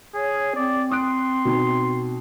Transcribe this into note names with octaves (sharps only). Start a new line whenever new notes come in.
G#4 C#5
C4 D5
C6 D#6 F#6 D7
B2 D#4